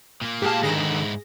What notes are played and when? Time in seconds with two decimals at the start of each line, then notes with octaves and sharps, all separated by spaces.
0.22 A#2 A#3
0.42 G#2 G4 G#4 F5 A5
0.63 G#2 D3 D#3 E4 G#4 A#6